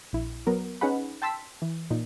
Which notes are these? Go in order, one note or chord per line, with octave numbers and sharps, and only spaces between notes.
A#1 E4
F#3 B3 A#4
C#4 D#4 G#4 B4 F#5 B5
G5 A5 C6 E6 B6
E3
A#2 D#4